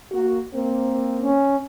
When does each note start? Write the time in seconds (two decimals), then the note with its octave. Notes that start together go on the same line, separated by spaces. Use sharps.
0.11 A#3 F#4
0.54 A#3 C4
1.20 C#4